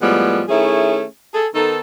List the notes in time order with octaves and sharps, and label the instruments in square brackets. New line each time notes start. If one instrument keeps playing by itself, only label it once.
[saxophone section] A2 F3 G3 G#3 B3
D#3 A3 C#4 E4 G#4
G#4 A4
D#3 B3 D#4 A4